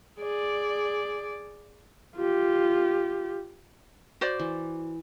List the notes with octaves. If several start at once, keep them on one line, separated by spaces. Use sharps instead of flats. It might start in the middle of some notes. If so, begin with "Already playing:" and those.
G#4 D5
F4 G4
F#4 C5 D5
E3